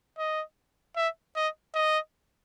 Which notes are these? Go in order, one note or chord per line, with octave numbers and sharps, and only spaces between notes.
D#5
E5
D#5
D#5